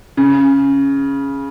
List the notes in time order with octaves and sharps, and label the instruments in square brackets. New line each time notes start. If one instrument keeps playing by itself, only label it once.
[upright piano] C#3